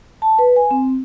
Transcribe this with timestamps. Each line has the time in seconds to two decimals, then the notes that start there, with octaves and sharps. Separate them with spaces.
0.22 A5
0.39 B4
0.56 G#5
0.71 C4